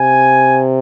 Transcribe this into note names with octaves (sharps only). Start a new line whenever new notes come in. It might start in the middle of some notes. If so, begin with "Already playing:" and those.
Already playing: C3 G#5